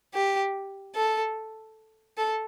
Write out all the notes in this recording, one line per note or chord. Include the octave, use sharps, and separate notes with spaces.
G4
A4
A4